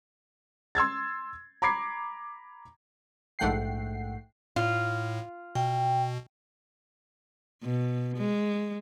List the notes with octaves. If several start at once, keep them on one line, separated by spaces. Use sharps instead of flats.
C6 E6 G#6 A6
A#5 B5 D6 G#6 C7
A#1 G#2 A3 F#5 G5 C7
A2 F4
B2 G5
B2
G#3